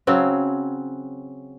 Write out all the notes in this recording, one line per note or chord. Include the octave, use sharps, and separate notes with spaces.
C#3 F#3 C4